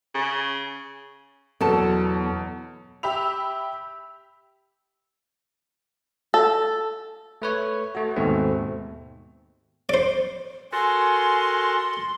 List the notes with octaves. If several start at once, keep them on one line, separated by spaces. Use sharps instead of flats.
C#3
E2 B2 F#3 A4 A5
G4 E5 B5 E6 F7
A4
A3 B4 C#5
A3 F#4
D#2 G#2 B2 A3 C4
C5 D5
F#4 A4 A#4 G#5 C6